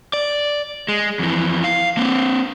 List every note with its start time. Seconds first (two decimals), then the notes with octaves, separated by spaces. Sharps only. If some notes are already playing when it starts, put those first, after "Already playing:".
0.13 D5
0.88 G#3
1.19 F2 E3
1.64 F5
1.97 A#3 C4